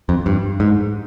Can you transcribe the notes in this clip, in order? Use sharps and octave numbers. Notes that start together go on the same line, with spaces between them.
F2
G2
G#2